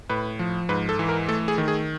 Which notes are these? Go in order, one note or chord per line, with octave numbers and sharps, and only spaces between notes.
A2 B4
F3
G#2 B4
A4
E3
A#4
A3 A4
G#4
D#3
G#4